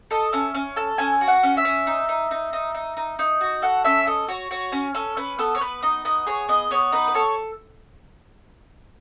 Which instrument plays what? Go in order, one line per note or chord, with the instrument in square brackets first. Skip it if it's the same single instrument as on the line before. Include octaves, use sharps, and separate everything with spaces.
[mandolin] A4 D#5
C#4 E5
C#4
A4 A5
C#4 G#5
F#4
F#5
C#4
E5
C#4
D#4
D#4
D#4
D#4
D#4
D#4
D#4
F#4
A4 F#5
C#4 E5
A4 D#5
F#4 C#5
F#4 C#5
C#4
C#4 A4
C#4 B4
B3 A4
C#5
B3 B4
D#4 D#5
B3 D#5
G#4 C#5
B3 D#5
B3 C#5
D#4 B4
B4
A4 C#5